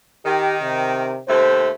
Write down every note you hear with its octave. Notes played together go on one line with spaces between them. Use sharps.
D#3 G4
C3
D#2 C3 A3 C5